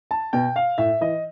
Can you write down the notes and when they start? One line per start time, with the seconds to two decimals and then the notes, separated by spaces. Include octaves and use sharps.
0.11 A5
0.33 B2 G5
0.56 F5
0.78 A2 E5
1.01 E3 D#5